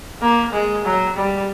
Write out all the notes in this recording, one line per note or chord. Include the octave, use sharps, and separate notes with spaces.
A#3
G#3
F#3
G3